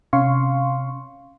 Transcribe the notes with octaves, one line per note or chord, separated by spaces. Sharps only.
C3 C#4 F5 C6 C#6